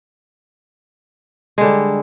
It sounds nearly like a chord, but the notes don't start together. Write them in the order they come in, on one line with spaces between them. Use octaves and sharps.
G#3 D3 G3